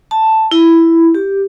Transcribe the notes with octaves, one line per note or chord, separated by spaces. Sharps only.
A5
E4
G4